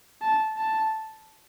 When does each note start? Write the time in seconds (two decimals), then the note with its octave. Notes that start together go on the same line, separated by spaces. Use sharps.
0.21 A5
0.57 A5